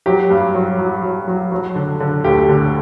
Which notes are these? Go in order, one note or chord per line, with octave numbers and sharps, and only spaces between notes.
F#3 G4
G2
F#3
F#3
F#3
F#3
F#3
D3
D3
D2 G4
D3